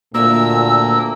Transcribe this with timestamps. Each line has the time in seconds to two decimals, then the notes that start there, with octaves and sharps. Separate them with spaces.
0.15 D2 A#2 A#3 E6